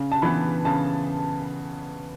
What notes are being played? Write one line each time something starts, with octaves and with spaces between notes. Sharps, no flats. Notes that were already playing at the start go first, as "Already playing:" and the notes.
Already playing: C#3
A5
E3 B3 B5
C#3 A5